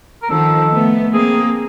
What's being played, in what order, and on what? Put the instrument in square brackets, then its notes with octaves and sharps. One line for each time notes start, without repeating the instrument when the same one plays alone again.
[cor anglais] A#4
[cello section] D#3 F3 [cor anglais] A4
[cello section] A3 B3
[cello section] A#3 C4 [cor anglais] G#4